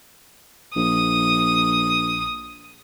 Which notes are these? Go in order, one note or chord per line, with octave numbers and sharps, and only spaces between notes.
A#1 D#6